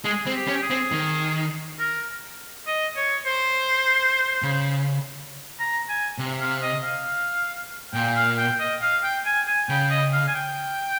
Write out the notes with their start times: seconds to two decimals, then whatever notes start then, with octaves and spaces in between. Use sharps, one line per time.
0.04 G#3 G#4
0.26 C4
0.34 G4
0.48 C#4
0.56 G4
0.62 G#4
0.70 C4
0.92 D#3
1.79 A#4
2.67 D#5
2.96 C#5
3.26 C5
4.43 C#3
5.59 A#5
5.89 G#5
6.18 C3
6.40 F5
6.62 D#5
6.83 F5
7.94 A#2 G5
8.16 F5
8.38 G5
8.60 D#5
8.81 F5
9.03 G5
9.26 G#5
9.48 G#5
9.69 C#3 G5
9.90 D#5
10.13 F5
10.28 G#5
10.34 G5